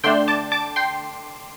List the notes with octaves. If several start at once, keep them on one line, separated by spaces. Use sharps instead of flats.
D3 A3 D4 G5 C6
A5 D6
A5 D6
G5 C6